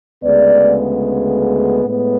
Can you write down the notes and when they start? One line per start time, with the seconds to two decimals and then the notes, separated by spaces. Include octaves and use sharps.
0.24 D2 C#3 G#3 B3 D5
1.85 A2 G#3 B3